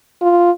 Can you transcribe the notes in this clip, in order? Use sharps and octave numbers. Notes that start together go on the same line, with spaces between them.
F4